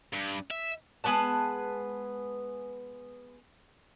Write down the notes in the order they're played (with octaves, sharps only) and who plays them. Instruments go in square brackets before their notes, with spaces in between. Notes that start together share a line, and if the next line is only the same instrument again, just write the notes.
[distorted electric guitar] G2
E5
[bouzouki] G#3 B3 B4 A5